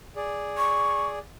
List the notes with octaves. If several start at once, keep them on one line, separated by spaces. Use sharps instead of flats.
G#4 D5
C#6